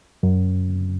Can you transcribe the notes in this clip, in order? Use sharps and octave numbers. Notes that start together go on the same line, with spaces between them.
F#2